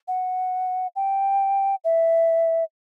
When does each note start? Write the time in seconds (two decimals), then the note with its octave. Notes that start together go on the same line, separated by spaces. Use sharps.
0.08 F#5
0.96 G5
1.84 E5